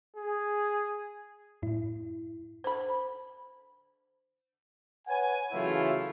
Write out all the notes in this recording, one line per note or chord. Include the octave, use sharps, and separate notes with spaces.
G#4
F#2 A2 E4
D3 C5 B5
B4 C#5 F#5 G#5
C#3 E3 F#3 A3 E4 F4